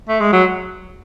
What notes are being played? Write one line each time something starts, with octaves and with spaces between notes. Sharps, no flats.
A3
G#3
F#3